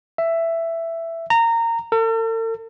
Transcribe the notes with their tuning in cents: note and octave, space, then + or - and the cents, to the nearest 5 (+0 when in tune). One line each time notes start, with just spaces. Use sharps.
E5 +10
A#5 -20
A4 +45